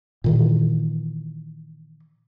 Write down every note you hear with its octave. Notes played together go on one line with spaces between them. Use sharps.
A#2 D#3 E3